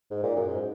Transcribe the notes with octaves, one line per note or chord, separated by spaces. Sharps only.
G#2
A#2
F#2
G#2